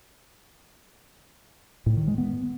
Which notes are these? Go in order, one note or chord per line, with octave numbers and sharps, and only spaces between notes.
A2
D#3
G#3
B3